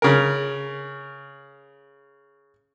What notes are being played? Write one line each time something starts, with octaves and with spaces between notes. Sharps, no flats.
C#3 A#4